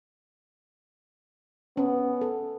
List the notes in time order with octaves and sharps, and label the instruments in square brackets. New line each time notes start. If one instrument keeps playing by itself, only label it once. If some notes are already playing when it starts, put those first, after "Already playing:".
[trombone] B3 [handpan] C#4
[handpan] A4